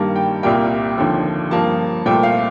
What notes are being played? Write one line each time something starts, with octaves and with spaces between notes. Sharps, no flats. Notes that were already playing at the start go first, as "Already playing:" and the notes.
Already playing: G2 D#3 G3 A#3 A5
G5
C2 A#2 G3 A#3 G5
D#2 D3 F3 C4
G2 F3 A#3 A5
C2 A#2 A3 C4 G5
F5